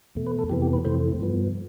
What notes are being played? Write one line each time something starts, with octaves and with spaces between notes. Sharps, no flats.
E2 B2 A3
B4
A4
F2 C3 E3 B3 G4
G4
B4
F2 C3 E3 A3 C5
G2 F3 B3